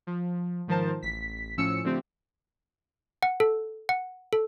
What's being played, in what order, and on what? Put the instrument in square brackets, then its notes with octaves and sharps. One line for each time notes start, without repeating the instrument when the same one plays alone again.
[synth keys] F3
G#2 D#3 F3 A#4 C5 A5
A1 B6
A2 F3 C#4 E6 C#7
D3 F3 A3 C4 G4
[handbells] F#5
A4
F#5
A4